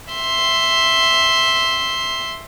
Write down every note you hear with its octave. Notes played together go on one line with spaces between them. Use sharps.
E5 C6